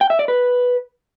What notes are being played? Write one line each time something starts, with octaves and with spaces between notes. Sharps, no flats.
G5
E5
D5
B4